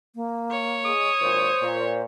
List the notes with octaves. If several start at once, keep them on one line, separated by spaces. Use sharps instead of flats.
A#3
C#5
G#3 D#6
G#1 A#2 C5
A#2